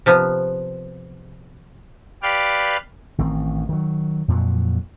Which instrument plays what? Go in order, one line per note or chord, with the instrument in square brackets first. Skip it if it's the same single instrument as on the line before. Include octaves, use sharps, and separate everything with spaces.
[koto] C3 F3 B3
[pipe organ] G4 B4 D5 F5
[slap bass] A1 D#3 C4
D#3 F#3
F2 A#2 F3 F#3